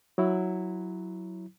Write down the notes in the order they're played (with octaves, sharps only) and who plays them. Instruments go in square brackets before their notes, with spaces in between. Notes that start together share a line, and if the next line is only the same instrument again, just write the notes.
[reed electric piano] F#3 E4